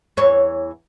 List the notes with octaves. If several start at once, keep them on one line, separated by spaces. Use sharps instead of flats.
E2 E3 C#5